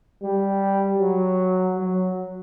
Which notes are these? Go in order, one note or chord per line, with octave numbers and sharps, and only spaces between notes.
G3
F#3
F#3